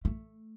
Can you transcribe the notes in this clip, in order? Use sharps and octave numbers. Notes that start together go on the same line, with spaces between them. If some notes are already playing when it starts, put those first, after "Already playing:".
A3